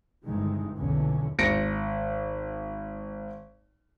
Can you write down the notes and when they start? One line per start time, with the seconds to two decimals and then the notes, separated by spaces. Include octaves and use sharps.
0.24 G1 G2 C3 D#3 E3 G#3
0.77 B1 E2 A#2 D3 E3 C#4
1.39 G#1 A#6 C#7 D7